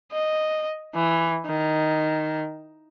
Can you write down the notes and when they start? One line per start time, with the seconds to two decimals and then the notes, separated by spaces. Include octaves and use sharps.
0.12 D#5
0.95 E3
1.46 D#3